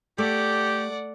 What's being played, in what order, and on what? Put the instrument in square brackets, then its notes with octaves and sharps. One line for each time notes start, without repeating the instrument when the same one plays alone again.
[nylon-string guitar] A3 [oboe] G4 [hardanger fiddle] D5 F#5